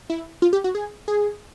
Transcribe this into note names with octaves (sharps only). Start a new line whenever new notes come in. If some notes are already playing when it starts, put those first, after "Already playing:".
E4
F4
G4
F#4
G#4
G#4